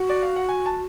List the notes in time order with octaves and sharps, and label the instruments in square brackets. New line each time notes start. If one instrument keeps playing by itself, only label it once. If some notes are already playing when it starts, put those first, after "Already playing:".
Already playing: [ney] F#4 [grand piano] F#5
[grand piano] D5
F5
F#5
G#5
A5